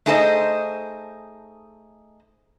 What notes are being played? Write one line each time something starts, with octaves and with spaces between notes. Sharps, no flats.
A3 D#4 G#4 A4 C5 D#5